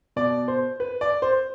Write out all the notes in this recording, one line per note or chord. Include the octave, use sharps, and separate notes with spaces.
B2 D5
C5
B4
D5
C5